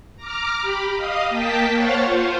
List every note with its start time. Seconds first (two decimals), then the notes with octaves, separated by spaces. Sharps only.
0.16 A#5 D6 F6
0.61 G4 B5
0.94 D#5 F5 D#6
1.29 A#3 G5 A5 B6
1.73 C5 C#5 F5 F#5 C#6 A6
2.04 F4 C5